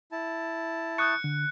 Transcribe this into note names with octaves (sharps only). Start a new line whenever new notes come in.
E4 A5
C#6 D#6 F#6 G6 C#7
D3